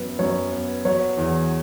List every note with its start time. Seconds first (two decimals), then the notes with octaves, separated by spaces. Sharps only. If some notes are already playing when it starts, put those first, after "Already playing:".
Already playing: F#2 B3
0.19 F#2 C#5
0.52 B3
0.85 F#3 C#5
1.17 E2